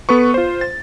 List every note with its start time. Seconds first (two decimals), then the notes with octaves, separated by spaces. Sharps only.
0.09 B3 A4 B4 C#6
0.34 F4 C5
0.61 A6